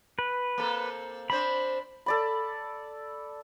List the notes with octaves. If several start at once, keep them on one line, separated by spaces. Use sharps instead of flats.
B4
A#3 C4 A4
C4 D4 C5 B5
A4 D5 B5